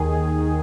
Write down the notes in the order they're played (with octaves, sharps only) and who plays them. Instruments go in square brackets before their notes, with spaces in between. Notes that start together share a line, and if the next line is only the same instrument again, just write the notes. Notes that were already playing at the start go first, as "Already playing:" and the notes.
Already playing: [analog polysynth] D#2 D#3 G#4